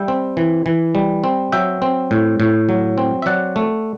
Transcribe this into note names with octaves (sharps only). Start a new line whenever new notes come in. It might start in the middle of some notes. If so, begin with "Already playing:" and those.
Already playing: G3 E5 G5
C4
E3
E3
G3
C4
F#3 E5 G5
C4
A2
A2
F#3
C4
E5
F#3 D5 F#5
A3